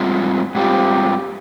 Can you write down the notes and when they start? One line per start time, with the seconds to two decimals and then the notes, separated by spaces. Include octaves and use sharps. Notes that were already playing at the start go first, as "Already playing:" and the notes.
Already playing: G#2 G3 C4 F4
0.55 G#2 G3 C4 F4 G4